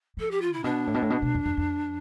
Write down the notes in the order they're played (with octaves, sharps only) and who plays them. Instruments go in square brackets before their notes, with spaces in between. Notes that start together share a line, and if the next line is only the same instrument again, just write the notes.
[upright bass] F3 [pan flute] A4
[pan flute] G4
F4
E4
[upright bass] A2
[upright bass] B2 [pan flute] D4
[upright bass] A2
B2
A2
B2
B2
F2
F2
F2